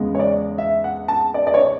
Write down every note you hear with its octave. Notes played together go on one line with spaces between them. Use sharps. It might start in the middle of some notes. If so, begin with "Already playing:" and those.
Already playing: E2 C#3 G#3 B3
C#5
D5
E5
F#5
A5
D5
D5
C#5